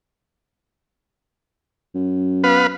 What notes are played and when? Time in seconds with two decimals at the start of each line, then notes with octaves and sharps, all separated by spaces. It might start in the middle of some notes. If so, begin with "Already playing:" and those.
1.95 F#2
2.44 B3 B4 F5